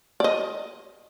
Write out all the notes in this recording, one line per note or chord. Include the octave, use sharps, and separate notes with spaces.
D5 D#5